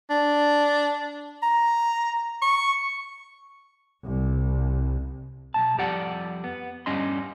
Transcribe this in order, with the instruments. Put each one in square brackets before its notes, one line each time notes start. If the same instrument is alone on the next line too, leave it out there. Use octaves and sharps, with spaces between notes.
[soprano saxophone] D4
A#5
C#6
[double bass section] C2
[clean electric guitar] B1 G2 A5
F2 G3 G4 D5 F#5
B3
G2 G3 C#4 D#5 C6